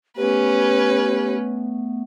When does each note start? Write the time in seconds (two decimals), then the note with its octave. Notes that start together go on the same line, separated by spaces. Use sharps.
0.17 A3 B3 C#4 G4 B4